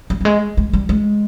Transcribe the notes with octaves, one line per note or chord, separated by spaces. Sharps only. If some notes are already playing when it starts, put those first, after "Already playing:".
G3
G3
G#3
G#3
G3
G#3